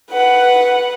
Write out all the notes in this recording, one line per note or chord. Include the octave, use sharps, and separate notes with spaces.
B4 F#5